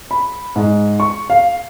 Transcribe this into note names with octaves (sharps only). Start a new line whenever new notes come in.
B5
G#2
C#6
F5